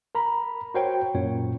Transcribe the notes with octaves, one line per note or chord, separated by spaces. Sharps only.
A#4 A#5 B5
F#4 A#4 C5 C#5 G5
F#2 A#2 C#5